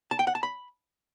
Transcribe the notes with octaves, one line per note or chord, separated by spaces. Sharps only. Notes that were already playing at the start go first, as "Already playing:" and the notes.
A5
G5
F#5
A5
B5